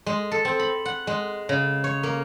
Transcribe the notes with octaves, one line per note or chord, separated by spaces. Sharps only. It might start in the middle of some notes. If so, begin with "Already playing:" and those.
G#3
A4
C4
B5
F#5
G#3
C#3
C#5
A#3